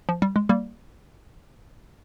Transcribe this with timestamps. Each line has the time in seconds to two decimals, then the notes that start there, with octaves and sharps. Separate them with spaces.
0.09 F3
0.22 G3
0.36 G#3
0.49 G3 A#3